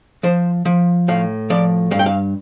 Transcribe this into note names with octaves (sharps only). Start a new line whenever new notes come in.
F3 C5
F3
A2 F5
F3 D5
G2 F5
G5
F5